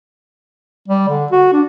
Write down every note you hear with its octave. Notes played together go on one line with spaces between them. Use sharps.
G3
D3
F#4
D4